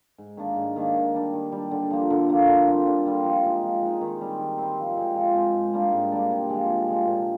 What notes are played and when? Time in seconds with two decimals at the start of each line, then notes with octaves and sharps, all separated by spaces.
0.18 G#2
0.37 D#3 A#3 D4
0.56 G#2
0.76 D#3 A#3 D4
0.95 D#3
1.14 G3 D4
1.33 D#3
1.52 G3
1.57 D4
1.71 D3
1.91 F3 A#3
2.10 D3
2.29 F3 A#3
2.48 D3
2.67 G3 C4 F4
2.86 D3
3.06 G3 C4 F4
3.24 F3
3.44 G#3 D#4
3.63 F3
3.82 G#3 D#4
4.01 D#3
4.21 G3 C4
4.39 D#3
4.58 G3 C4
4.78 F3
4.97 G#3 C4
5.15 F3
5.35 G#3 C4
5.53 G#2
5.73 G3 A#3 D4
5.92 G#2
6.12 G3 A#3 D4
6.31 C3
6.50 F3 G#3
6.69 C3
6.88 F3 G#3
7.07 A#2